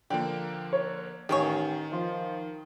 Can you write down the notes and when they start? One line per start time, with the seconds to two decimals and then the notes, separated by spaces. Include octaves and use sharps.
0.10 D3 F3 A#3 D5 G5
0.73 C#5
1.29 A1 D#3 G4 G#4 C#5
1.92 F3 F4